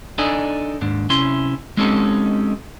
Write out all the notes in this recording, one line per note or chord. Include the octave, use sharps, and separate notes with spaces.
D4 D#4 A4 D5 D#5 G#5
D#2 G#2 D4
C3 C#4 E4 C6
G#3 C4 C#4 D#4 G4 A4